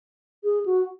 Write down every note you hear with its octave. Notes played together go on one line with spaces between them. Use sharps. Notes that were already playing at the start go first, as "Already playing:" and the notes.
G#4
F#4